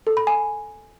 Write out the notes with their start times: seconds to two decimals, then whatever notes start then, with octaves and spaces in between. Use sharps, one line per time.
0.07 A4
0.17 B5
0.27 G#5